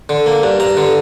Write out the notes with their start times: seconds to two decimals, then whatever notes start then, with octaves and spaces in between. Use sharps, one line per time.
0.09 D3
0.26 A#3
0.43 G2
0.60 G2 A#5
0.77 D3